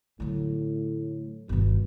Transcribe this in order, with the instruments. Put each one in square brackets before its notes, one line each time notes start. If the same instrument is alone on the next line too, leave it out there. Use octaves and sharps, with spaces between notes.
[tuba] A2 [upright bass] D3 F#3
[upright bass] G1 D#3 [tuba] B2